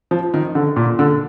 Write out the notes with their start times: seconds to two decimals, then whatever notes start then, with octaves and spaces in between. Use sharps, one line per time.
0.11 F3
0.34 D#3
0.55 D3
0.76 A#2
0.99 D3